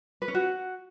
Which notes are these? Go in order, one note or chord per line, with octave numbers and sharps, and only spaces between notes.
B4
C#4
F#4